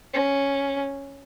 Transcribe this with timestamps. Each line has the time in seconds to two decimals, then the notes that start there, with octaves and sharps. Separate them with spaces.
0.13 C#4